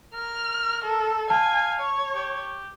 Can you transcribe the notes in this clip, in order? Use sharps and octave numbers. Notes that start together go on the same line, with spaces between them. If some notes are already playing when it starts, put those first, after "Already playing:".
A#4 F6
A4
F5 G#5 A5
C#5
G4